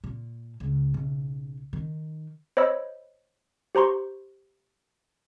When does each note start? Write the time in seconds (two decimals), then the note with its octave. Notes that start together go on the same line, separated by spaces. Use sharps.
0.04 A#2
0.60 C#2
0.94 B1 C#3
1.73 D#3
2.57 C5 C#5 D#5 B5 E6
3.75 G4 C5 A#5 C6 C#6